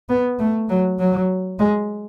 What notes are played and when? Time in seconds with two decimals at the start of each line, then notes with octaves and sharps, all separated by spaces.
0.09 B3
0.39 A3
0.69 F#3
0.99 F#3
1.59 G#3